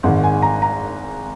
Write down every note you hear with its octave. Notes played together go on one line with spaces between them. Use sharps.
G#1 G#2 D#3 F#5
G#5
A#5
A#5